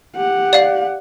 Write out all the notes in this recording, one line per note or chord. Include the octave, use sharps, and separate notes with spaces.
G4 F#5
D5 F5